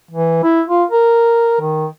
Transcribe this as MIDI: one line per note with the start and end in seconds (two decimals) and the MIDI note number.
0.11 0.40 52
0.43 0.62 64
0.68 0.84 65
0.91 1.58 70
1.61 1.87 51